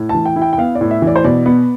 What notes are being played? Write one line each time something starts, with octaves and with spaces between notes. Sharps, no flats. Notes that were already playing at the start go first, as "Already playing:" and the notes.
Already playing: A2
A5
E3
G5
E4
G5
G5
B3 F5
D5
A2
E5
E3
D5
C5
B2 D5
B3